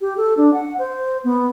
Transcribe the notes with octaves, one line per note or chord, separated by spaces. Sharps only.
G4
A4
D4
F#5
C5
B3